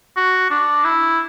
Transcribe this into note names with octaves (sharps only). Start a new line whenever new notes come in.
F#4
D4
E4